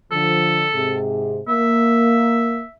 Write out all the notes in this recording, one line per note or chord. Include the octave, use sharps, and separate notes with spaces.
D3 F3 A4
G#2 C3 G#4
A#3 E5